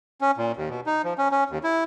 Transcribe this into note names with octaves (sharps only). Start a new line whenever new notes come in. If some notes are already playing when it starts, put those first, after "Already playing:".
C#4
A#2
D#2
B2
D#4
F3
C#4
C#4
D#2
E4